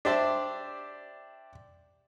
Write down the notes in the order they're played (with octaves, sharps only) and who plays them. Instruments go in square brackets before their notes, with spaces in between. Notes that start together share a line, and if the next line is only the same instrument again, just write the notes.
[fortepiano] D4 G4 C5 D5 E5